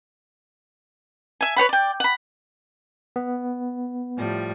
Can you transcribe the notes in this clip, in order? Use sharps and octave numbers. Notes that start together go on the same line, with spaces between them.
E5 G#5
B4 C#5 F#5 B5
D5 G5
F#5 B5
B3
A2 F3 G3